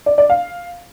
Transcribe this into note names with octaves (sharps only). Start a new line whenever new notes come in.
D5
D5
F5